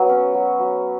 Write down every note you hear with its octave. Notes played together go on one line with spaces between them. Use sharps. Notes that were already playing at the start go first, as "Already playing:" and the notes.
Already playing: F#3 B3
C#4
F#3
F#3